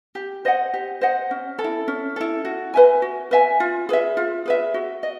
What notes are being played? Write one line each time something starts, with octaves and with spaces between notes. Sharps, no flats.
G4
C5 D#5 F#5
G4
C5 D#5 F#5
C#4
A4
E4
C#4
E4 A4
F#4
B4 E5 G#5
F#4
B4 E5 G#5
F4
G#4 B4 E5
F4
G#4 B4 E5
F#4
D#5